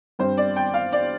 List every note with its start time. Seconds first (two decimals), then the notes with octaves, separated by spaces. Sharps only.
0.19 G2 G3 C4 C5
0.38 D5
0.56 G5
0.74 F5
0.93 D5